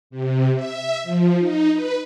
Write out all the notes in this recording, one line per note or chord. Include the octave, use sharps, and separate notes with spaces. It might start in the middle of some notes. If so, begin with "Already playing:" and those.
C3
E5
F3
D#4
B4